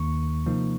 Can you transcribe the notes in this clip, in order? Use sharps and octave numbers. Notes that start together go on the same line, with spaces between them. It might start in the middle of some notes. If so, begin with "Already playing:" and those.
Already playing: D#2 D#3 A#3 C#6
C3 F3 A#3 D#4